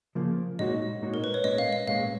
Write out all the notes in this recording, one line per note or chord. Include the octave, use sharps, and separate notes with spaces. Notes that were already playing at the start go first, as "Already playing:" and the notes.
C#3 F3 A#3
A#2 G#3 D#4 F#4 C#5 D#5
A#2 G#3 D#4 F#4 C#5
A#4
B4
C#5
A#2 G#3 C#4 D#5
F5
D#5
A#2 G#3 C#4 F5